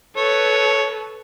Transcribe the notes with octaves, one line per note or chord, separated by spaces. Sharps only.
A4 B4 C#5